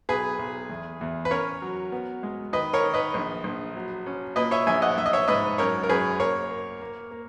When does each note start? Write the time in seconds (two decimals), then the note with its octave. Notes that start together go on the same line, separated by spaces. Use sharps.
0.09 B1 G#4 B4
0.39 B1
0.69 E2
1.01 E2
1.25 B4
1.31 C#4 A#4 C#5
1.62 F#3
1.92 B3
2.23 G#3
2.53 D#3 B4 D#5
2.73 A#4 C#5
2.83 D#3
2.94 B4 D#5
3.14 A#1
3.44 A#1
3.76 F#3
4.06 C#4
4.36 A#2 B4 D#5
4.51 C#5 E5
4.67 A#1 E5 G#5
4.82 D#5 F#5
4.98 A#1 E5
5.06 D#5
5.13 C#5 E5
5.28 G#2 B4 D#5
5.58 F#2 A#4 C#5
5.83 A#4
5.89 F#2 G#4 B4
6.20 A#3 A#4 C#5
6.50 A#3
6.81 A#3
7.11 A#3